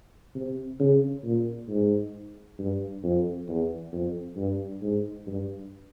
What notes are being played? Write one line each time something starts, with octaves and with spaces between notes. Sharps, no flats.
C3
C#3
A#2
G#2
G2
F2
E2
F2
G2
G#2
G2